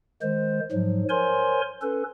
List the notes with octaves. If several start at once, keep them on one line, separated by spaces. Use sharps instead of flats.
D#3 G#3 C5
G#2 F3 F#3
A#4 C5 C#5 G#5 C6
C#4 A4 B4